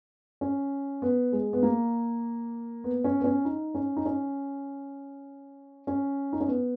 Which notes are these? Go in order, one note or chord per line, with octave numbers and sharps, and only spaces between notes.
C#4
B3
G#3
B3
A#3
B3
C#4
B3
C#4
D#4
C#4
D#4
C#4
C#4
D#4
C#4
B3